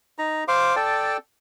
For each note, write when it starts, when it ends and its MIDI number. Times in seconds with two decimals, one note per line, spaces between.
0.19 0.44 63
0.19 0.44 82
0.48 0.76 72
0.48 0.76 77
0.48 0.76 84
0.48 0.76 86
0.76 1.17 69
0.76 1.17 74
0.76 1.17 79
0.76 1.17 81